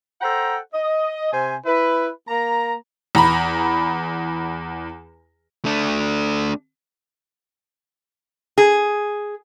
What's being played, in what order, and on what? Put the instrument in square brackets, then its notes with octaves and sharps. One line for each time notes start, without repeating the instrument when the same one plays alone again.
[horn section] A4 C5 F#5 G5 A#5
D#5
C3 C5 G#5
E4 B4
A#3 A#5
[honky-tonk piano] E2 A#5 B5
[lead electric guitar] A3 D4
[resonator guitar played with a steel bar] G#4